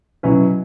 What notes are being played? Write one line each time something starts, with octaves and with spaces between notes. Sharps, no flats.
B2 F#3 C#4 E4 B4